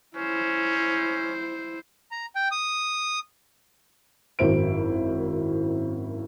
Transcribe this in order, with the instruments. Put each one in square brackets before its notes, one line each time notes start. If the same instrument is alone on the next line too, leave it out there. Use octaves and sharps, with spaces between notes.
[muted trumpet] C#4 [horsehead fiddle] E4 C5
[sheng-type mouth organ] A#5
G5
D#6
[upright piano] G#1 F#2 E4 C5 D7